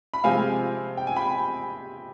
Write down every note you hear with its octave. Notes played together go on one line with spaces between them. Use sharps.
B5
C3 F3 G#3 C4 F5 G#5
G5
G#5
G5 B5